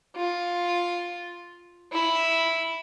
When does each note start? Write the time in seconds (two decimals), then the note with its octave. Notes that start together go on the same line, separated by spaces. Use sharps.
0.16 F4
1.92 E4